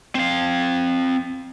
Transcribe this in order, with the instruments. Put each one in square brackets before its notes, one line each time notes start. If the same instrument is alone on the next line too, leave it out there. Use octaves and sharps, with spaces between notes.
[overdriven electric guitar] C4 F5